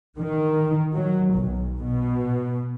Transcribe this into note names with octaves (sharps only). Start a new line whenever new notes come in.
D#3
F#3
B1
B2